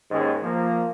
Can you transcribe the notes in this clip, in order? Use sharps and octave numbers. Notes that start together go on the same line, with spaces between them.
D#2 G#2 D#3 G#3 C#4
F3 A#3